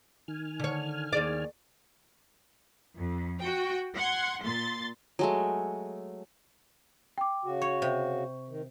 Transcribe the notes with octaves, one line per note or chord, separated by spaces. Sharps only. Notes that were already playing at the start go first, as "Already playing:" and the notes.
D#3 G#5 F6
D3 C#5
D#2 G#4 D5
F2
F#4 G5
F#5 C6 G#6
A#2 C6 A6
F#3 G#3 A3
G5 D6
C#3 F#4
C#5 C#6
C3
D#3